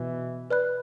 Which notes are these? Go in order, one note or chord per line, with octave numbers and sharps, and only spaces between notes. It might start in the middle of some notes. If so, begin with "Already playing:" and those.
Already playing: B2 E3
B4 D5 B5 F#6